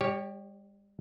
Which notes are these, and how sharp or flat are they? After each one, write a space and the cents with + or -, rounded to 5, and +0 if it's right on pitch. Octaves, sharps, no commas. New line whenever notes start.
G3 +45 G4 +0 C#5 +0